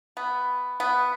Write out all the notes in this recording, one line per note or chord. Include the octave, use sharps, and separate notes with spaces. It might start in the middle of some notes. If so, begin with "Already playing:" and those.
B3
B3